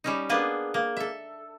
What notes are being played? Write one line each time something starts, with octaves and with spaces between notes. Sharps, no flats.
G3 C#4 D#4
A#3 B3 D4 G#4 B4
A#3
A4 E5